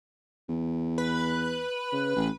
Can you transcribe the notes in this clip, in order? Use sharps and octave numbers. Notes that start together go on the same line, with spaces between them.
E2
B4
C#3
A1